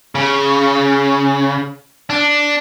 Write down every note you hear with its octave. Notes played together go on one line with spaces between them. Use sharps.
C#3
D4